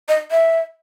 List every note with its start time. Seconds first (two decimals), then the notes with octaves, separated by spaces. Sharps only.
0.09 D#5
0.31 E5